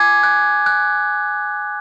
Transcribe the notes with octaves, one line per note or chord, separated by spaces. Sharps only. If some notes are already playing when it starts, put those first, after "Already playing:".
Already playing: G#5 D6 G#6
F#6
F#6